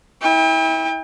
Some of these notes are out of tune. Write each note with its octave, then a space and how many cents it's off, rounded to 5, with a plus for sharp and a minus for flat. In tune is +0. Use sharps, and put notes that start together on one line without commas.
E4 -30 G5 +35